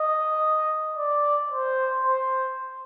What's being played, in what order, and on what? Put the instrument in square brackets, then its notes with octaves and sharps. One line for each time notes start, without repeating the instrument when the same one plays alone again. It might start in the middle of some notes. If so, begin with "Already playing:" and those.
Already playing: [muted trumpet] D#5
D5
C5
C5